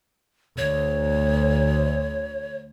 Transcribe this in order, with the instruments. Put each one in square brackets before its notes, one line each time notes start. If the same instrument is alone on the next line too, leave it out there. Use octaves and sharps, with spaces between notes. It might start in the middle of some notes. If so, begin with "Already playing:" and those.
[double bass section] D2 [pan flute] C#5